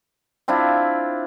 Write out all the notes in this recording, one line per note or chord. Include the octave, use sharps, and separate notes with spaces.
C4 D4 E4 F4